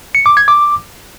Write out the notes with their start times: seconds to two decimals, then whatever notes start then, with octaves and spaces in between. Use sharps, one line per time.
0.15 C#7
0.26 D6
0.37 G#6
0.48 D6